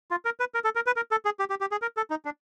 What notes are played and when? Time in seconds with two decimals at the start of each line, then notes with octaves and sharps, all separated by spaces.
0.11 F4
0.25 A#4
0.40 B4
0.54 A#4
0.64 A4
0.75 A#4
0.86 B4
0.96 A#4
1.11 A4
1.25 G#4
1.39 G4
1.50 G4
1.61 G4
1.71 G#4
1.82 A#4
1.97 A4
2.10 D#4
2.25 D4